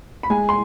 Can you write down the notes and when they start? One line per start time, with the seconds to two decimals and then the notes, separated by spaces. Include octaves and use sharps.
0.23 B5
0.30 G#3 G#5
0.49 C6